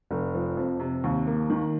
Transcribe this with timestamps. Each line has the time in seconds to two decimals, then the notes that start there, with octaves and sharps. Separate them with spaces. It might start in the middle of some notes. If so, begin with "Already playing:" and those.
0.11 F1
0.34 F3
0.57 F2
0.80 C3
1.04 D#2
1.27 A#3
1.50 D#3